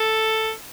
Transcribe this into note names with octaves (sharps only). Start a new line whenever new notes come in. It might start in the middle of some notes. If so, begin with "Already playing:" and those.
Already playing: A4